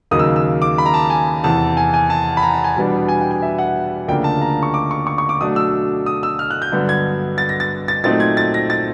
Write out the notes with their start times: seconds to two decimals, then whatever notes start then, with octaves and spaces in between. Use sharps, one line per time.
0.11 D#2 C#3 F#3 A#3 D#4 D#6
0.19 E6
0.36 E6
0.62 D6
0.78 B5
0.86 A#5
0.94 A5
1.10 G#5
1.44 E2 C3 E3 A5
1.77 G#5
1.94 G#5
2.10 A5
2.37 B5
2.42 A#5
2.54 A5
2.64 G#5
2.76 E2 B2 G3 B3 D4
3.08 G#5
3.21 G5
3.31 G#5
3.42 E5
3.58 F#5
4.08 D2 C#3 F3 A#3 D4 G5
4.24 A5
4.41 A#5
4.63 C#6
4.74 D6
4.91 C#6
5.07 C#6
5.18 C#6
5.29 D6
5.41 B2 F#3 A3 D4 D#6
5.56 E6
6.06 D#6
6.23 E6
6.39 F6
6.51 F#6
6.62 G6
6.72 G2 D3 F#3 B3
6.89 G#6
7.38 A6
7.49 A#6
7.60 A6
7.88 A6
8.04 A#2 F#3 A3 C4 D#4 A6
8.20 G#6
8.37 A6
8.54 A#6
8.70 A6